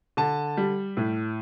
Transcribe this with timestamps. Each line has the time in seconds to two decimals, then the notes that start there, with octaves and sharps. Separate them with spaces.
0.17 D3 A5
0.57 G3
0.97 A2